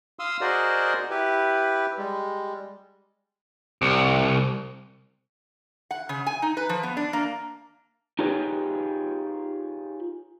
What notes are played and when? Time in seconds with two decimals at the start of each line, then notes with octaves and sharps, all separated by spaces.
0.19 F5 C6 D#6 E6
0.41 F#4 G#4 A#4 C5 D5 D#5
1.10 E4 G4 B4
1.98 G3 G#3
3.82 C2
5.91 F#5
6.09 C#3
6.27 G#5
6.42 D#4
6.57 B4
6.69 F3
6.83 B3
6.97 D4
7.13 A#3
8.19 D#4 F4 G4 G#4 B4 C#5